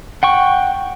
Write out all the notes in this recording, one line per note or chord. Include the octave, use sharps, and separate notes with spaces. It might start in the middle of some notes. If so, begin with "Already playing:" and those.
F#5 G5 C#6